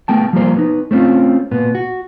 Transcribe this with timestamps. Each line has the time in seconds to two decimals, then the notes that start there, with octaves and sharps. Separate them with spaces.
0.08 A3 B3 G5 A5
0.33 F3 G3 A#3 C5
0.57 B3 D#4
0.91 A3 C4 C#4 F4
1.51 A#2 B3
1.75 F#4